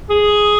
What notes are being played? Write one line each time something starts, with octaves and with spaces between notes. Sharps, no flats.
G#4